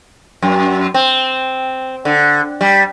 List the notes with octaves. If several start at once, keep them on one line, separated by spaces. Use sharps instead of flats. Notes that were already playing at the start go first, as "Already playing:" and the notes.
F#2
C4
D3
G3